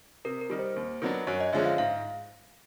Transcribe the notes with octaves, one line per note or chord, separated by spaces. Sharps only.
C3 A#4
A#4
D#3 G3
C5
D#2
D#3 F#3 B3 D4
F#2 C#5
D#5
D3 F3 G#3 C#4 E5
F5
G#2 F5